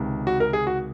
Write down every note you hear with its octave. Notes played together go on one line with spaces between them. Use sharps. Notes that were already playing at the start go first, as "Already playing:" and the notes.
Already playing: C#2 C3 D#3
F#4
A#4
G#4
F#4